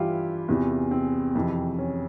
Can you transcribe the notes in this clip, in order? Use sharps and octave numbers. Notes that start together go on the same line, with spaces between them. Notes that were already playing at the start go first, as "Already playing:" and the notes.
Already playing: G2 E3 E4 F4 G4
E2 C3 E3
C4
F2 C3 E3
C#4